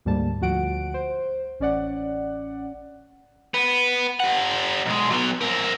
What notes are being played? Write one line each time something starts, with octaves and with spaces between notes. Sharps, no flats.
D2 G#2 G3 A#3 A5
D2 F3 F#4 F#5 D7
C5
A1 C#4 D5 F#5
B3
G3 F#5
B1 G#3
F#3 B3
C4 A#4